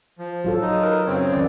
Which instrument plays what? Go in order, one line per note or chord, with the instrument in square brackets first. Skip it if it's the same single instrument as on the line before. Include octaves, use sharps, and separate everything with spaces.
[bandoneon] F3
[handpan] F#3 F4 A4
[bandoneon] D#4
[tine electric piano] A#4 B4
[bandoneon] F#2 C#3 C4 [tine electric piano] C#5 G5
[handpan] D#3 C#4 [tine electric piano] D5